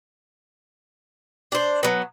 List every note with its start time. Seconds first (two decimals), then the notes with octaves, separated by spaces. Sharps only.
1.52 D4 C5
1.83 F#3 B3